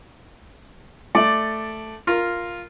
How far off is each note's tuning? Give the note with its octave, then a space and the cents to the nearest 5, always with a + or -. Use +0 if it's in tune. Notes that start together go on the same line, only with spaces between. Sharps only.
A3 +0 D5 +5 D6 +0
F4 +0 A#4 +0